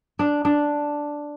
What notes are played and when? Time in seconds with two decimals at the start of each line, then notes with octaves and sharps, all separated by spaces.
0.19 D4
0.45 D4